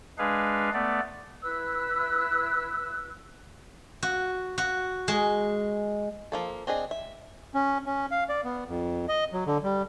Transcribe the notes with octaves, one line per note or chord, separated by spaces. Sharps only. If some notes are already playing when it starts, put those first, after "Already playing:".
G#3 D4 G#4 B4 F5
A3 B3 D5
E4 B4 E6 F#6
F#4
F#4
G#3
F3 A#3 A4
C4 D4 G#4 D#5
E5
C#4
C#4
F5
D5
B3
F2
D#5
F#3
D3
G3